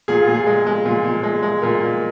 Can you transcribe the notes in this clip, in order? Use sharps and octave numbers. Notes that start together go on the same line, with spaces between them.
A#2 G#4
F4
A#2
G#4
G#3
G#3
A#2
A#2
G#3
G#3
A#2 A#4
A#2